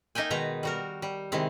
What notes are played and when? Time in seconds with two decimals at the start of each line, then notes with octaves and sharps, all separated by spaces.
0.15 A#3 D#4 E5 G5 G#5
0.31 B2 D#3 G#3 B4 A#5
0.63 G3 F#4 A#4
1.02 G3
1.32 C3 D#3 G#3 E4